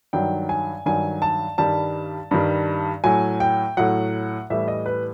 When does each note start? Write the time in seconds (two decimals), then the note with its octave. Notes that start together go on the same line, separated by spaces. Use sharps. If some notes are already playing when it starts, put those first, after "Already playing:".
0.13 G2 D#3 F#3 G5
0.49 G#5
0.86 G2 D#3 F#3 G#5
1.22 A5
1.58 G2 D#3 G3 A5
2.31 G2 D#3 G3
3.04 A2 F#3 G#5
3.40 G5
3.77 A2 F#3 F#5
4.50 A2 E3 G3 E5
4.68 D#5
4.86 B4